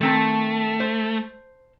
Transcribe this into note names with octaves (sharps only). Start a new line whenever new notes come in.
D#3 A3 C4 A5
C5